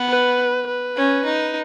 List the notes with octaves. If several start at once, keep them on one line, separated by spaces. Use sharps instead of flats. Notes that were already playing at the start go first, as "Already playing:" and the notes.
Already playing: B3
B4
B4
C#4
D#4